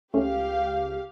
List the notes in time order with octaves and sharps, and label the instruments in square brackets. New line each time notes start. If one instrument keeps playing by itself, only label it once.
[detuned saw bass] C#2 [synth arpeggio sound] A3 C#4 [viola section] G4 F5